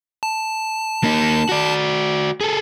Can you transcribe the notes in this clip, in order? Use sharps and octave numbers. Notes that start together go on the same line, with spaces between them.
A5
A#3 D#4
F#4 D5
G#4 A4